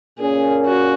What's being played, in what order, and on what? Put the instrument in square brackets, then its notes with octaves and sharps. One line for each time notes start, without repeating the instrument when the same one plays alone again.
[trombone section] A#2 A#3 C#4 [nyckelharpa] G#4
[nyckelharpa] F#4